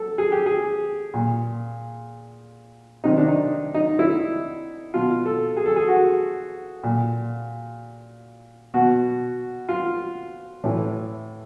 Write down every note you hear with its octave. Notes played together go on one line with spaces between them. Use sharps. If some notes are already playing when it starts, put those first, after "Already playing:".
Already playing: A4
G#4
G4
G#4
A#2
C3 D#3 D#4
D4
D#4
D#4
E4
B2 F4
A4
G#4
A4
G#4
F#4
A#2
B2 F#4
F4
A2 E3